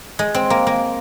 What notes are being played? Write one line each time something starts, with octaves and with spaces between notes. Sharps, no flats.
G#3
C4
A#3
A#3